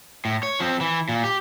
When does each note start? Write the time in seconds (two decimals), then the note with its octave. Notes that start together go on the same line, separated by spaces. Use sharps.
0.25 A2
0.43 C#5
0.60 F3 C4
0.81 E3
1.09 A#2
1.24 G4